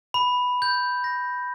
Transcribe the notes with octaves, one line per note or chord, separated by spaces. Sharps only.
B5
G6
A#6